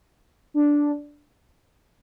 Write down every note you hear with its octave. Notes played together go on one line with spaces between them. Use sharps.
D4